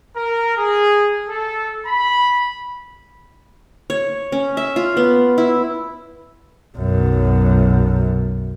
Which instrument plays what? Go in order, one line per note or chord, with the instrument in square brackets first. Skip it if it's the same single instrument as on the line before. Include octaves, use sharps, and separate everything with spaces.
[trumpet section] A#4
G#4
A4
B5
[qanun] C#5
C#4
E5
F4
B3
E4
[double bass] B1 F#2